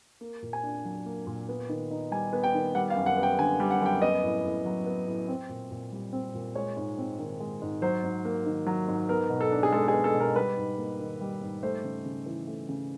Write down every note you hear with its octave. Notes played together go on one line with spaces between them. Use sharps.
A#3
A#2
G#5
D4
F#3
A#3
A#2
B3
D#3
D#4
G3 G#5
B3
G5
D#3
G3 F#5
F5
F#2
F#5
B3
G5
D3 G#5
G3
F#5
F#2
G5
B3 D#5
A2
A2
F#3
B3
A2
C4
A#2
A#2
G3
C4
A#2
G#3 C#5
G#2
C4
D#3
G#3
G#2
F#3 C5
G#2
A#3
D#3
F#3
G#2
B3 A#4
B2
A4
D4
G#4
G#3 A4
G#4
B3
A4
B2
A#4
G3 B4
G#2
A#3
D#3
G3
G#2
A3 C5
C#3
C#3
E3
A3
C#3